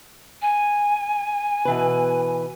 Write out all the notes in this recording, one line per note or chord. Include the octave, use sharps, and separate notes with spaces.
G#5
B2 E3 B4